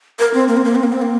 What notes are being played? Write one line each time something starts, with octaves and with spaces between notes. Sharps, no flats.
A#4
C4
A#3
C4
A#3
C4
A#3
C4
A#3